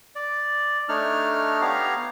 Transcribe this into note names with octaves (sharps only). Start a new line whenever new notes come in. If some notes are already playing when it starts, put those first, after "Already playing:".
D5
A3 D4 D#4 C#5 F6
B3 G4 C#5 F5 A#5